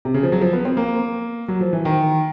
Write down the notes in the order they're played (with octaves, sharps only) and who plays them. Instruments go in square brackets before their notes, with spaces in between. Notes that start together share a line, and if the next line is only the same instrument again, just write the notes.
[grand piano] C3
C#3
F3
F#3
F3
B3
C4
A#3
F#3
F3
E3
D#3